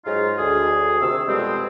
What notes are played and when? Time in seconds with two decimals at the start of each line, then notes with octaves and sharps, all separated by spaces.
0.05 G#2 F#3 G#3 D#4 F4
0.38 D2 G#4
1.00 C3 D#3 E6
1.26 F2 B2 G3 G#3 C4